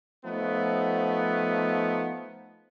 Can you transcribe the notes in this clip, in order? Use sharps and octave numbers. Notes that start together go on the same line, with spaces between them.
F3 A3 B3 D#4